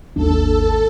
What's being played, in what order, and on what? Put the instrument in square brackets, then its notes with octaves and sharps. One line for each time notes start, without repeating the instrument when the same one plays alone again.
[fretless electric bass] G#1 D#2 D4 [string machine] A4